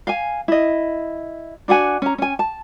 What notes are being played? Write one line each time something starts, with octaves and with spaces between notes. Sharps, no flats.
F5 G#5
E4 D#5
D4 F#4 F#5 G#5
C#4 A#5
C#4 G#5
A5